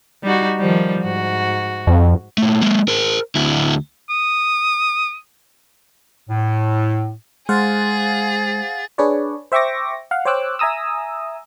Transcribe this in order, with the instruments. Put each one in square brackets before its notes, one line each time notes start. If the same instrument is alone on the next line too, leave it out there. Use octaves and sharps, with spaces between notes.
[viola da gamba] G3 D#4 F#4
D#3 F3 G3
G#2 F#4
[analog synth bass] F2
[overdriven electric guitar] A#2 A3
G#3 A#3
A#4 C5
D2 E4
[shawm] D#6
[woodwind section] A2
[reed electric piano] G#3 [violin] G#4 [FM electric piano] C5 F5 F#5 [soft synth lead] A6
[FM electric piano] D4 G#4 B4 C#5 D5
C5 E5 G5 C#6 D6 A#6
F5 F#5
C5 C#5 G5 D6 E6 F#6
E5 G#5 A#5 D#6 E6